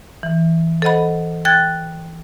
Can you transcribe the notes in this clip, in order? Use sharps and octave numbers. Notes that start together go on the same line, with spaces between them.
E3
A4 C5 D#5 F#5 B5
G5 F#6 G#6 A6